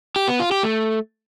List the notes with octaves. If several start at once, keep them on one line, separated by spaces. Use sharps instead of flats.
G4
B3
F4
G4
A3